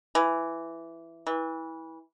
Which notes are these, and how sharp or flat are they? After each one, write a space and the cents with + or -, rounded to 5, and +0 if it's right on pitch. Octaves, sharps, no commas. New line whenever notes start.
E3 +10
E3 -20